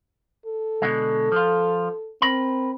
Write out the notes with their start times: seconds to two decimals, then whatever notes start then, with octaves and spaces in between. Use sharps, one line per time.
0.46 A4
0.82 B2 D3 G#3
1.32 F3 F4
2.22 C4 A#4 B5